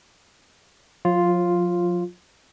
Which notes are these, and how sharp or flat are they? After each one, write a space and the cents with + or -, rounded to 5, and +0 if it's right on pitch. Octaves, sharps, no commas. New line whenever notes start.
F3 +45 F4 +0 C#5 -45